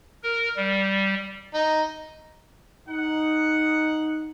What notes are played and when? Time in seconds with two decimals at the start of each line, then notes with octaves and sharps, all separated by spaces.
0.23 A#4
0.57 G3
1.54 D#4
2.89 D#4 F#5